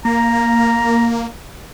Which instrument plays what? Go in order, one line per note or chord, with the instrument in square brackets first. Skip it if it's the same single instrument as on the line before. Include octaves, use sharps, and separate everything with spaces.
[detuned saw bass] A#3 [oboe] A#5